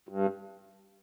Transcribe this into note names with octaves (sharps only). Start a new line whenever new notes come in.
G2